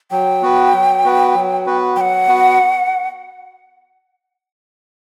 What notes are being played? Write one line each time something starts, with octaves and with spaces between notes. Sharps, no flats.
F#3 G5
B3 F#4 B4
F#3
B3 F#4 B4
F#3
B3 F#4 B4
F#3 F#5 G5
B3 F#4 B4